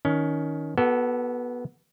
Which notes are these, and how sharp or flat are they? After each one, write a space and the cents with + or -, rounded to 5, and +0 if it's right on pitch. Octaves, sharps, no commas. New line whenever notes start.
D#3 +15 C#4 +20
B3 -15 F#4 +30 A4 -5